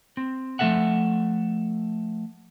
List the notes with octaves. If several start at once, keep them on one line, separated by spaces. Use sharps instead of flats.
C4
F3 A3 B3 A4 E5 F#5